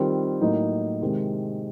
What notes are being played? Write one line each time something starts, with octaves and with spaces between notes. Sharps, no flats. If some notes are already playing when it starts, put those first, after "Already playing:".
Already playing: D#3 G3 C4 F4
A2 F#3 A#3 D#4
C3 D#3 G#3 C4